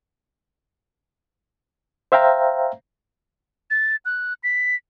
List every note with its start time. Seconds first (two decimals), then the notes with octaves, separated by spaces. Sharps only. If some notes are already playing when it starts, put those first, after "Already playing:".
2.12 C5 E5 F5 G5 A#5
3.70 A6
4.05 F#6
4.43 B6